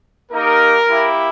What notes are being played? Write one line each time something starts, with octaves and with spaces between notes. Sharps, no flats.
A#3 D#4 G4 A#4
A#3 E4 G4